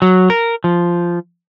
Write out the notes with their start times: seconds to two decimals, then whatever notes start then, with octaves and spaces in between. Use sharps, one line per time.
0.02 F#3
0.30 A#4
0.64 F3